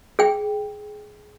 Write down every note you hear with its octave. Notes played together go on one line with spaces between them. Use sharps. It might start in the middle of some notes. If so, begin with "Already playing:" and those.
G#4 G5